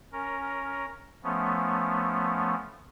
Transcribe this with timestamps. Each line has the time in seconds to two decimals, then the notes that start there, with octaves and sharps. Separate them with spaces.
0.13 C#4 A#4
1.24 F3 A3 B3 C#4